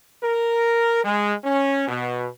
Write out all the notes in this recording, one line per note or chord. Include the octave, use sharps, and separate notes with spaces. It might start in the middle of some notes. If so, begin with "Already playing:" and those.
A#4
G#3
C#4
B2